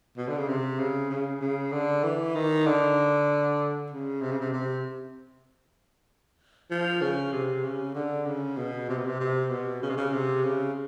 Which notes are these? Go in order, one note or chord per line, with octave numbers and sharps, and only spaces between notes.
B2
D3
C#3
C3
C#3
C#3
C#3
D3
E3
D#3
D3
C#3
C3
C#3
C3
C3
F3
C#3
C3
C#3
D3
C#3
B2
C3
B2
C3
C3
B2
C#3
C3
C#3
C3
C#3